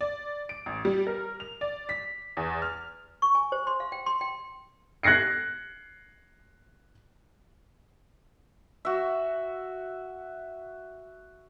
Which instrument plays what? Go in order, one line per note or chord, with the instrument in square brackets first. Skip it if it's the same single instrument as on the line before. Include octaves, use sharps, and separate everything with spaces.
[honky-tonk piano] D5
D7
A1
G3
A#4
F7
D5
B6
E2
F6
[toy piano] C#6
G#5
C5
C6
F5
G5
C6
G5
[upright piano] F#6 G#6 A#6 C7 C#7
[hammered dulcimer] F#4 E5